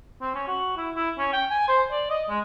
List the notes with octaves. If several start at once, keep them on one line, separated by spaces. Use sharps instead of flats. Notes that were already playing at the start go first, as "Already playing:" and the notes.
C4
C#4
F#4
E4
E4
C#4
G5
G#5
C5
D5
D#5
G#3